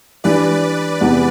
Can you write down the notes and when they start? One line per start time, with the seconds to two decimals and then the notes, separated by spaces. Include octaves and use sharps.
0.24 E3 G3 D4 B4 D5
1.01 E2 C3 E3 B3